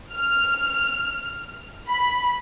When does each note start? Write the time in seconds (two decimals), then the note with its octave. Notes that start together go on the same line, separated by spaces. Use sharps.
0.14 F6
1.89 B5